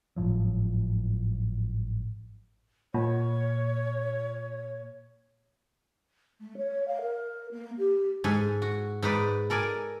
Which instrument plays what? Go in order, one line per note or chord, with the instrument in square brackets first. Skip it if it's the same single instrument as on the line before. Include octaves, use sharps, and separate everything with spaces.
[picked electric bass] G#1 A2 F3 F#3
[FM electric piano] A#2 [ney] C#5
[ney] A3
C#5
F5
A#4
A#3
G4
[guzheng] G#2 A4 G#5
F#4
G#2 D#4 B4 D5
A4 A#4 D5 G#5